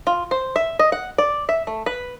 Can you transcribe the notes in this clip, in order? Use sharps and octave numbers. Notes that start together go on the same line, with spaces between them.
F4
C5
E5
D#5
F#5
D5
E5
A3
B4